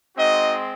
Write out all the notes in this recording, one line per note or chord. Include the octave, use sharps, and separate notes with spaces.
G#3 C4 D#4 F#4 D#5